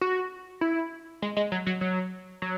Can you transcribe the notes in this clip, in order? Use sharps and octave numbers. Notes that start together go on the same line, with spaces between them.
F#4
E4
G#3
G#3
F#3
F#3
F#3
F#3